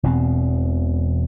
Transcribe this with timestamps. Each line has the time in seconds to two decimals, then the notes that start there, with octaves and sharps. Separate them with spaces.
0.03 E1 E2 B2 C4